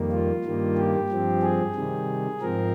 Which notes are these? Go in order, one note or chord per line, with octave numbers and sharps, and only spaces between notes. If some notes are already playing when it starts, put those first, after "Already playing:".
Already playing: F2 D#3 G3 A#3
F4
G2 D#3 G3 A#3
G4
G2 F3 C4
G#4
C3 D#3 G3
G#2 F3 C4 A#4